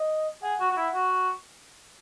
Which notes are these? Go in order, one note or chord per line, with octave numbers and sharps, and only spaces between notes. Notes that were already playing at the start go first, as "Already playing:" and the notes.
Already playing: D#5
G#4 F#5
F#4
F#4
E4
F#4